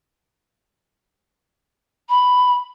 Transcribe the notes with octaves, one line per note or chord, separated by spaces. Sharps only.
B5